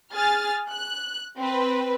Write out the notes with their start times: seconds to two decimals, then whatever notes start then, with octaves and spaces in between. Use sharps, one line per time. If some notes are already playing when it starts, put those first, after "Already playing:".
0.15 G#4 F6 A6
0.71 F#6
1.38 C4 B4